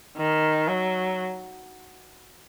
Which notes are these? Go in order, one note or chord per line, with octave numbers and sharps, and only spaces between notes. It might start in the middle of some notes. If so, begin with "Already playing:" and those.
D#3
F#3